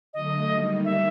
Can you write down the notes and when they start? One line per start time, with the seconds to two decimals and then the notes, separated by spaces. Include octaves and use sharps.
0.13 D3 F#3 A3 D#5
0.49 D#3 G3 A#3 D#4
0.84 E5